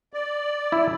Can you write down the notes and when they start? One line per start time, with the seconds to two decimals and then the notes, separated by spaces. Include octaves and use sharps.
0.13 D5
0.72 E4